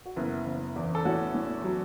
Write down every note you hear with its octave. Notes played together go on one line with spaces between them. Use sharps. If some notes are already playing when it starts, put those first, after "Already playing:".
F#4
F#1 B3 E4
F#1
E2
A4
A2 C#4 F#4
A2
F#3